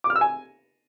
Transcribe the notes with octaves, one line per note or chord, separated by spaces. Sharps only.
D6
F6
E6
G#5